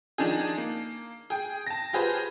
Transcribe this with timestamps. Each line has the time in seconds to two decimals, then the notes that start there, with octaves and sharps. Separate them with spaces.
0.18 D#3 F3 D4 D#4 G#4
0.58 A#3
1.30 G#4 G5
1.67 A5 A#6
1.93 F4 G4 G#4 B4 C5